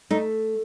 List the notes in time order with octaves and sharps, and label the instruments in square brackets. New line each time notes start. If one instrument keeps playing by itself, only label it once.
[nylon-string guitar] A3 D#4